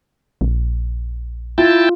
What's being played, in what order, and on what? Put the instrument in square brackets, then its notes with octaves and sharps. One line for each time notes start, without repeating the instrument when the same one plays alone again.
[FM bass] A#1
[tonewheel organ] E4 G5 A5 [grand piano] F4